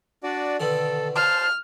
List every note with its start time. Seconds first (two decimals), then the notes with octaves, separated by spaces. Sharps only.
0.23 D4 F#4 D5
0.60 B2 D3 D#3 A4
1.16 F4 C5 A5 F6